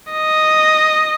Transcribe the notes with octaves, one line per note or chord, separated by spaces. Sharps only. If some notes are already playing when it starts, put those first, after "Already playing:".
D#5